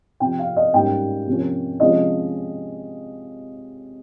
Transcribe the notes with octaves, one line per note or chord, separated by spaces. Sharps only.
C3 F3 C4 G5
F5
D#5
G#2 G3 A#3 C#4 G5
C3 F3 A#3 C#4
C3 F3 G#3 C#4 D#5